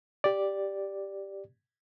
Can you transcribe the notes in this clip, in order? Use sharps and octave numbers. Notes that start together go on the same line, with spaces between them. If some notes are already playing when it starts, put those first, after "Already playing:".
G4 D5